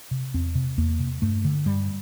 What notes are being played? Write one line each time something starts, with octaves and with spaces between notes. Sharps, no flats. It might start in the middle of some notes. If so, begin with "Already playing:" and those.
C3
E2 C4
C3
E2 A#3
C3
G2 A3
D3
G2 G3